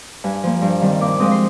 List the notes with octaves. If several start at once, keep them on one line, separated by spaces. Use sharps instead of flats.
G2 G#5
F3 A#3
G2
D#3 G3 C4
A#2 D6
F3 G#3 C4 D#6
C6